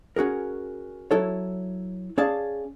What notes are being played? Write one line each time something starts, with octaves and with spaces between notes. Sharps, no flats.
C#4 F#4 G#4 A#4
F#3 E4 A4 C#5
C#4 G#4 D5 F5 A5